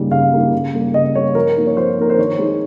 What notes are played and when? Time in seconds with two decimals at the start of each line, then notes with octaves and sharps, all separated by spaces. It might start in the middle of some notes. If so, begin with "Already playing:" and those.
Already playing: C#3 G3 A#3 D#4
0.11 C#3 F5
0.32 G3 A#3 D#4
0.53 C#3
0.74 G3 A#3
0.94 C#3 D#5
1.15 G3 A#3 C#5
1.35 F3 A#4
1.57 A#3 D#4
1.67 C#5
1.77 F3 C5
1.98 A#3 D#4 A#4
2.10 C5
2.18 D#3 C#5
2.39 G#3 D#4